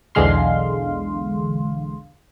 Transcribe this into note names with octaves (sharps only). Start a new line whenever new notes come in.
B1 E2 D3 G#3 F5 C6